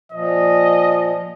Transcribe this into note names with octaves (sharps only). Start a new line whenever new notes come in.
A#2 F3 D#5